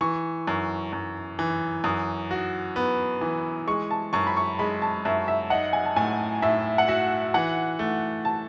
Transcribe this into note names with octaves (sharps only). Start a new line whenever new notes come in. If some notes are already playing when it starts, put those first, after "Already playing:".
E3 C#6
F#2
F#2
E3
F#2 D#6
F#4
B3
E3
G#3 C#6
A5
F#2 C#6
B5
C#6
G#3 B5
A5
F#2 E5
E5
D#4 F#5
G#5
A5
A2 G#5
A2 E5
F#5
F#4 E5
E3 F#5
A3
A5